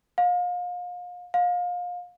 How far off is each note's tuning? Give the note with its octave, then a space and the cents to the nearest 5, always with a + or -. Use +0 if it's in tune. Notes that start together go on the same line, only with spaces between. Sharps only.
F5 +35
F5 +30